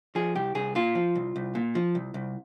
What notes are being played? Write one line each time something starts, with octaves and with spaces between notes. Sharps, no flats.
F3 G#4
C2 G4
C2 G#4
A#2 F4
F3
C2
C2
A#2
F3
C2
C2